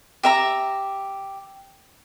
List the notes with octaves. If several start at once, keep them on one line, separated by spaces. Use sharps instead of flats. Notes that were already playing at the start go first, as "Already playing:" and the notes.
G4 E5 A#5